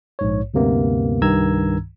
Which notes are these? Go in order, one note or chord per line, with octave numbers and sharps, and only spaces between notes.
A#1 G#2 C#5
D2 G2 C3 A#3 B3
C2 G2 D#3 A#5 E6 G#6